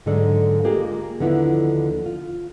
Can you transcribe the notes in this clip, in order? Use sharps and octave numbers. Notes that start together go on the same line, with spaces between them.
G#2 D3 F#3 G#3 A4 D5
G#3 A#3 F4 G4 G#4
D#2 D3 F3 B3 E4
F4